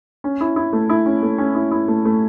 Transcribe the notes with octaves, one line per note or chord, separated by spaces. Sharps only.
C#4
E4
E4
A3
E4
C#4
A3
C#4
E4
E4
A3
A3